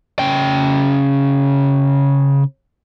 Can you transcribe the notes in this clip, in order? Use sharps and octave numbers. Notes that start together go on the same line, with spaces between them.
C#3 G5